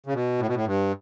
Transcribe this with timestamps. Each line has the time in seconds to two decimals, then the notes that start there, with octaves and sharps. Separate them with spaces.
0.06 C#3
0.14 B2
0.39 A2
0.47 B2
0.54 A2
0.65 G2